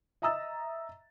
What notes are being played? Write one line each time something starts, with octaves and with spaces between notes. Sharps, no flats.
D#5 E5 A#5 D#6 E6 A6